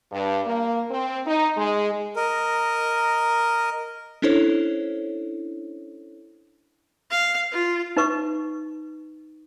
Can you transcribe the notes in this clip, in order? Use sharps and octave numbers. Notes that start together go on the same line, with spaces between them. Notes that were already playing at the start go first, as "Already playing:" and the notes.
G2
A#3
C4
D#4
G#3
A#4 D#5
C#4 D4 E4 A4 C5 C#5
F5
F4
D#4 B4 C#6